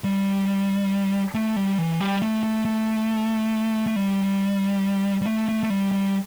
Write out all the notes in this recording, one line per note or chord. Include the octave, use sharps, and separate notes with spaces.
G3
A3
G3
E3
G3
A3
A3
A3
A3
G3
G3
A3
A3
A3
G3
G3